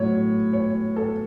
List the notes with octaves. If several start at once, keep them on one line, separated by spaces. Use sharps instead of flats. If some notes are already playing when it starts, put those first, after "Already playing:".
Already playing: A2 F#3 C#5
C#5
A4